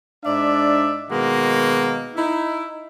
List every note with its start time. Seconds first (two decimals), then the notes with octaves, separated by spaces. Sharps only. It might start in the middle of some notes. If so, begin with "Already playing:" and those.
0.24 G#2 D4 D5 E5
1.11 B2 D#3 G#3 A#3 F#4
2.16 D#4 E4